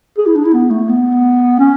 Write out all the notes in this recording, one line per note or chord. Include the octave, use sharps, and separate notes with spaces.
G#4
E4
D4
E4
B3
A3
B3
C#4